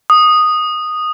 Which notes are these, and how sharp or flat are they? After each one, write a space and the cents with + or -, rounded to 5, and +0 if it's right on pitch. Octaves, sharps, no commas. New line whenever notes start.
D#6 -10